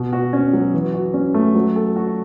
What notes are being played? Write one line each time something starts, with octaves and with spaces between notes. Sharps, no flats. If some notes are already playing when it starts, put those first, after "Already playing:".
Already playing: B2
F#4
C#4
F#3
E3
F#4
C#4
A3
F#3
A4
F#4